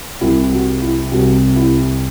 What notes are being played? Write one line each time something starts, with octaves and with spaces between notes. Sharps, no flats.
C2 C3 G3 E4
F#4
E4
C2 C3 G3 F#4
E4